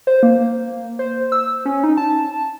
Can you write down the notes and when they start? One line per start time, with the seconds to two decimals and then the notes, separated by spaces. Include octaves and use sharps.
0.07 C5
0.23 A#3
0.99 C5
1.32 E6
1.65 C#4
1.84 D#4
1.97 A5